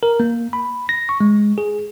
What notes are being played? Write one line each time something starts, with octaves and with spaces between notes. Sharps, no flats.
A#4
A#3
B5
A#6
C#6
G#3
G#4